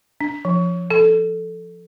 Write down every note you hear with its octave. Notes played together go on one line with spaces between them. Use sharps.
D4
F3
A4